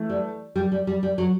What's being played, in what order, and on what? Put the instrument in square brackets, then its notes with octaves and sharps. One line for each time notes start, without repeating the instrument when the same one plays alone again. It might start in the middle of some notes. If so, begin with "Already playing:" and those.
Already playing: [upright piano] E3 A3
[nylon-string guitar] G3
G3
G3
G3
G3
F#3